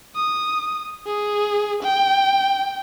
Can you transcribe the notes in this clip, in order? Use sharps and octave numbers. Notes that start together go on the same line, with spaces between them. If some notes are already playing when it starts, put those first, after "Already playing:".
D#6
G#4
G5